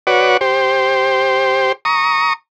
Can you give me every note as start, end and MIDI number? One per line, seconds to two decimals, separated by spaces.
0.07 0.37 66
0.07 0.37 71
0.07 0.37 73
0.07 0.37 74
0.07 0.37 78
0.41 1.72 67
0.41 1.72 72
1.85 2.33 82
1.85 2.33 85
1.85 2.33 87